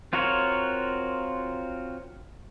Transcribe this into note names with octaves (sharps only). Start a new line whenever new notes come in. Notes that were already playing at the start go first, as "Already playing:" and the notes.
C4 F4 F#4 A#4 C#5